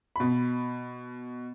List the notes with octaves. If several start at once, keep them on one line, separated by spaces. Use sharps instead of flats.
B2 B5